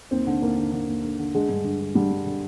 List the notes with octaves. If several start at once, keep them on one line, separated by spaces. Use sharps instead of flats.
D#2 C4
D3
D#2 A#3
D3
D3
D#2
D3
D3
D3 G#3
G2
D3
D3
D3 G3
G2
D3